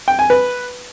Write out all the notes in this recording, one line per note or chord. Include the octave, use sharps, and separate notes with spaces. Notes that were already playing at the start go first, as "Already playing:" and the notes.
G5
G#5
B4